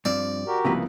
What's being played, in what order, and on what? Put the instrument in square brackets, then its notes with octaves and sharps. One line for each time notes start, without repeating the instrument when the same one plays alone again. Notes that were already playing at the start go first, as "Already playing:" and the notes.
[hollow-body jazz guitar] G2 F3 C4 [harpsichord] D5
[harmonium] F#4 G4 A#4
[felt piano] C2 F3 B3 [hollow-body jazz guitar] C#3 A#3 B4